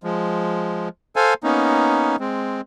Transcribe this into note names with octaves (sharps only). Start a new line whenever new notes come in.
F3 G#3
A4 C5 F5 G#5
A#3 B3 C#4 D#4
G#3 C4